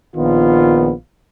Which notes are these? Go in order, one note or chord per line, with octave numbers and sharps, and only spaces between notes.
A#1 D#3 B3 F4